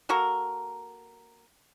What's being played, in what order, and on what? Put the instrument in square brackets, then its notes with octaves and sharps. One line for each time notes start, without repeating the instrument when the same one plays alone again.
[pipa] A#3 F#4 A4 A#4